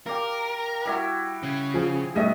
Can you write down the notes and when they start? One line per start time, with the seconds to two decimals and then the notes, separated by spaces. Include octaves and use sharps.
0.06 G4 A#4 D5 F5
0.85 G3 E4 F#4
1.43 C#3
1.74 F3 G#4
2.15 B2 G3 A3 D#4 D#5 E5